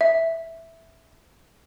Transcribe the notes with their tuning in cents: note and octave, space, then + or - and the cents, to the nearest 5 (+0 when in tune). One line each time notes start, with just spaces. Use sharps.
E5 -5